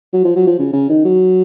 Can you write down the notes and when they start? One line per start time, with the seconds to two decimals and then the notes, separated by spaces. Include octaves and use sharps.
0.13 F#3
0.24 F3
0.36 F#3
0.47 F3
0.59 C#3
0.73 C#3
0.89 D#3
1.04 F#3